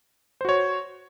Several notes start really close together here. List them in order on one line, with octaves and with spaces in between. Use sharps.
C5 F#4 C#5